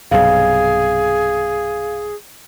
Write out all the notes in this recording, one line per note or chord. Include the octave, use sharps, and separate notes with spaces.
B1 G2 C3 G#4 F5